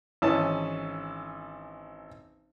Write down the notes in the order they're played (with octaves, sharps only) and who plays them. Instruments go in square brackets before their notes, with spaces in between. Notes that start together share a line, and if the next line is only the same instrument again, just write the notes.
[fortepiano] G#1 E3 C#4 A5